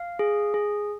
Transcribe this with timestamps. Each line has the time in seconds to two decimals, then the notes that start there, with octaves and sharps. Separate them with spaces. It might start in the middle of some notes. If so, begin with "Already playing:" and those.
Already playing: F5
0.19 G#4
0.54 G#4